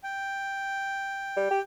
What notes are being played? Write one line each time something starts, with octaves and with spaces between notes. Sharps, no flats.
G5
G3
G4